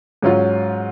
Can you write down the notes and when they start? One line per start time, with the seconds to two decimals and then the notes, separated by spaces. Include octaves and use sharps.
0.22 G#2 F#3 C#4 F4